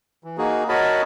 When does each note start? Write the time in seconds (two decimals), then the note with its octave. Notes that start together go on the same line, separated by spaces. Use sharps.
0.24 E3
0.38 A#3 D#4 F#4 G#4
0.69 F#4 A#4 C#5 D#5 A5 B5